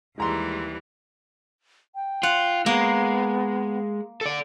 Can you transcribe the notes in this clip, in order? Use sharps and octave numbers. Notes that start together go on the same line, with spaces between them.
D#2 E3 G3 G#3 A#5 C6
G5
F4 F#5
G#3 A#3 B3
A4 D5